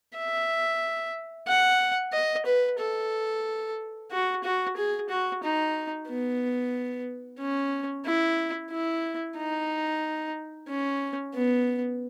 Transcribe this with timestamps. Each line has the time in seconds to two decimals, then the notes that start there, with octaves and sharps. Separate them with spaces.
0.16 E5
1.48 F#5
2.13 D#5
2.46 B4
2.79 A4
4.11 F#4
4.44 F#4
4.77 G#4
5.10 F#4
5.43 D#4
6.08 B3
7.39 C#4
8.06 E4
8.71 E4
9.37 D#4
10.68 C#4
11.34 B3